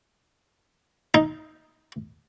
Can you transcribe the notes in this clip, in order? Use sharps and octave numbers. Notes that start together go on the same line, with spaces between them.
D#4